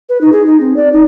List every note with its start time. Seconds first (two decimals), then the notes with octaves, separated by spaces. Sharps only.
0.09 B4
0.21 D#4
0.32 G#4
0.46 D#4
0.60 C4
0.76 D5
0.93 D#4